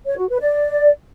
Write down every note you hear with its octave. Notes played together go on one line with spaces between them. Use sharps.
C#5
F#4
B4
D5